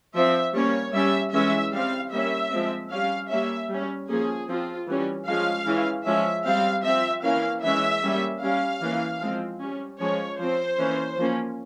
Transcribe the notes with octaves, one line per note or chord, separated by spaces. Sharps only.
F3 C4 E5
G3 A#3 C#4 C#5
G3 C#4 E5
E3 G#3 C#4 E5
G3 C4 F5
G3 A#3 C#4 E5
F3 G#3 C4
G3 C#4 F5
G3 A#3 C#4 E5
G3
C#4
F3 A#3 C#4 G#4
F3 C4 F4
E3 G3 C#4
F3 G#3 C#4 F5
E3 G#3 C#4
F3 G#3 C#4 E5
G3 C4 F5
F3 C4 E5
E3 A#3 C#4 F5
E3 G#3 C#4 E5
G3 A#3 C#4
G3 C#4 F5
E3 A#3 C#4
F3 G#3 C4
G3 C#4
F3 G#3 C#4 C#5
F3 C4 C5
E3 A#3 C#4
F3 A#3 C#4